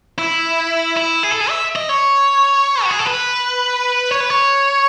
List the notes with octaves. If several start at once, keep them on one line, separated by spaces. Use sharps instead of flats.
E4
E4
G#4
A4
G#4
E5
D#5
C#5
F#4
G#4
A4
B4
C#5
B4
C#5